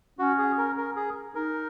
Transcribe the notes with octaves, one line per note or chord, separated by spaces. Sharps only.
C#4 F#4
G#4
A#4
A#4
G#4
D#4 A#4